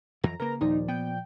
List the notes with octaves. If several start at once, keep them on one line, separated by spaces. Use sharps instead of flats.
F2 E3 A#5
C#3 A#3 A#4 B4 A#5
D#2 A#2 F3 D#4 D5
B3 G5